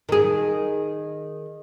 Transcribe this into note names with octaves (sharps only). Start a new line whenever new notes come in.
D#3 G#4